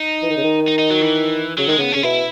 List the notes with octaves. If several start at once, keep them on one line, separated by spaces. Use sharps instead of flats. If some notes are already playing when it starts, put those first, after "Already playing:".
Already playing: D#4
E3
D#3
C#3
D#3
D#4
D#4
F#3
E3
C#3 F#3
D#3 G#3
C#3 B3
C#3 C#4
B2 E4